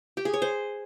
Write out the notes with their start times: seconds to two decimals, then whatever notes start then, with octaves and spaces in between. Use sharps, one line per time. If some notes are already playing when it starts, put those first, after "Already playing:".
0.17 G4
0.25 G#4
0.34 C#5
0.42 C5